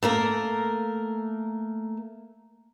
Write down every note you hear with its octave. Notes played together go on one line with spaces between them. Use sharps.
A3 A#3 A#4